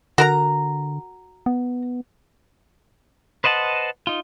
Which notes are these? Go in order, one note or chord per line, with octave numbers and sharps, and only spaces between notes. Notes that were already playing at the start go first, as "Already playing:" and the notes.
D3 F#4 A#4 A#5
B3
B4 C5 D#5 F#5 A5
D#4 F4